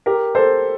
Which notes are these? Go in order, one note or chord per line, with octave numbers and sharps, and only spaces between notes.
G4 A#4
A4 C5